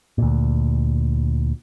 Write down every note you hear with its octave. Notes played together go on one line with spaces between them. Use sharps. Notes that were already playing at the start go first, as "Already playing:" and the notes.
D2 A#2